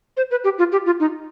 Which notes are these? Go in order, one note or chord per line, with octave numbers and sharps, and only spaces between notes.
C5
B4
G4
F4
G4
F4
D#4